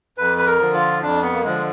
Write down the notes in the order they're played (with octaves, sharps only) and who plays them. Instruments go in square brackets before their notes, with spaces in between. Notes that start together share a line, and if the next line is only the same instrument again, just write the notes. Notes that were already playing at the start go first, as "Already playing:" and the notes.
[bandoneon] F2 B4
B4
A#4
D3 F3
F4
F2 D4
B3
A#3
D3 F3 G#3